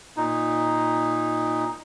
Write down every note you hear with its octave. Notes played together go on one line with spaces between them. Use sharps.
A#2 D#4